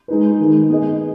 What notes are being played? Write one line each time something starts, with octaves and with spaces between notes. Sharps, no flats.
G#3 D#4 B4
D#3 G#3 D#4
B3 G#4 D#5